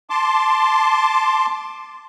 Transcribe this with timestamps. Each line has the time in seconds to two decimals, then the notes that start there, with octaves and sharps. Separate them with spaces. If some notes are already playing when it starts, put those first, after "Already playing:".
0.10 A5 C6 D6